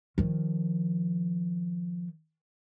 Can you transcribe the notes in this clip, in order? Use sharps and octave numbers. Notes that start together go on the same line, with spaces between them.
D#3 F3